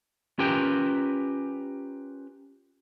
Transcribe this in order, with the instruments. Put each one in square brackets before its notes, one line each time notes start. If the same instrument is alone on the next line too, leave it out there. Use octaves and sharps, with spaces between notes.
[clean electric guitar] C#4 F4 G4 A#4 B4 G5